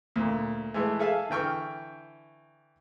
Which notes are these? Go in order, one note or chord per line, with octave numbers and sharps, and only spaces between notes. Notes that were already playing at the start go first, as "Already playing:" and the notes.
D2 A#2
E3 G#3 A3
G#4 A4 E5 F5 G#5 A5
D3 E3 G5 C#6 F6